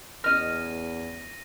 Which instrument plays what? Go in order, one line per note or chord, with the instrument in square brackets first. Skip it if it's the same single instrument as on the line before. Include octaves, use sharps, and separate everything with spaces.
[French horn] E2 [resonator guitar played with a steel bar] C#4 D#5 [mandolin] F6 [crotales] A#6 D#7